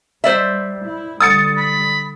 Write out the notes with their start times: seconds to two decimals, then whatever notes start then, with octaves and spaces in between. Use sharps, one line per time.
0.24 G3 C5 D5 E5
0.85 E4
1.20 D3 G3 D#6 A6 C#7
1.57 B5